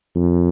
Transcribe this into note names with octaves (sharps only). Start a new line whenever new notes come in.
F2